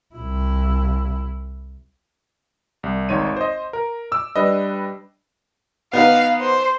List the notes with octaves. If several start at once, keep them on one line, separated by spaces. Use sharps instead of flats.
C2 E4
C2
G#1 D#4 C#5 C6 C#6 D#7
C5 D#5
A#4
D6 E6
G3 D4 B4 D#5
B3 D#4 B4 F5
C5